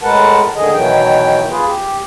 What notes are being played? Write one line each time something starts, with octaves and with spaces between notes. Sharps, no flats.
A2 G#3 A#4 B4 F#5 A5
D2 D3 D#3 G#4 D#5
B2 D#3 E3 F#3 G5
E2 F4 G#4 B4
G4